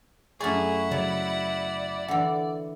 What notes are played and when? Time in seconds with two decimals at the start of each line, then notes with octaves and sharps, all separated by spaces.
0.40 F#2 A3 E4 G#4 D5 F#5 C#6
0.91 C#3 F#3 D5
2.08 D3 E3 F#5